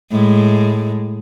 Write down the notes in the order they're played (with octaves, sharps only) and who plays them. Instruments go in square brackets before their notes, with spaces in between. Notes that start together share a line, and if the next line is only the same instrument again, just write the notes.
[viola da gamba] A2 G#3